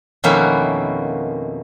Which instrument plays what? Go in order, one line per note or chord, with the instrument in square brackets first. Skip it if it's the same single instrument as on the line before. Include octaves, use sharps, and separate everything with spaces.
[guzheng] F2 B2 D#3 A#3 C#4 E4